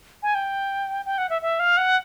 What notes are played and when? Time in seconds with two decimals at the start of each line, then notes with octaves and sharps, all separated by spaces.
0.23 G#5
0.35 G5
1.06 G5
1.18 F#5
1.30 E5
1.42 E5
1.60 F5
1.77 F#5